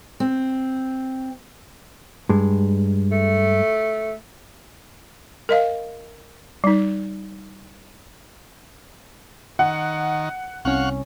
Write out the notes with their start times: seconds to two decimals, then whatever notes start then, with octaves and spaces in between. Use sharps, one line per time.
0.20 C4
2.29 G2 G#3
3.12 A3
5.49 A#4 D#5 F5
6.64 G3 D#4
9.59 D#3 F#5
10.65 C2 C#4 F5 F#5 C#6